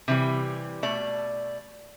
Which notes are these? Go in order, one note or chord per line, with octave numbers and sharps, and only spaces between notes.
C3 E3 G3
B2 A3 D5